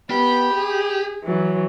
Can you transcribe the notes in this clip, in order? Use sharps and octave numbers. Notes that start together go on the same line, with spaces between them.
B3 G4 B5
G#4
E3 F#3